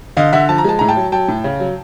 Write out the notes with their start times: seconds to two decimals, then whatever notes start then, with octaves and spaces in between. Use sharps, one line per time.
0.17 D3 D#5 F5
0.32 D3 E5 F#5
0.49 F3 A5
0.58 A#5
0.64 G#3 A5
0.79 A2 A#5
0.88 G5 A5
0.97 F#3
1.12 F#3 G5 A5
1.28 A2
1.44 C#3
1.60 F#3